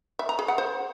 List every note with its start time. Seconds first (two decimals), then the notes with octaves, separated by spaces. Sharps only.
0.19 E5
0.29 A#5
0.39 G#4
0.48 F#5
0.58 C5